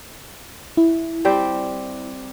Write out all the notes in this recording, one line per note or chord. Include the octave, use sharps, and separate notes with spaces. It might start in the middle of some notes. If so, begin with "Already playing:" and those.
E4
G3 C4 G4